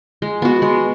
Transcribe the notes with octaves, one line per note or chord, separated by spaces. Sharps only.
G#3
B3 F#4
G#3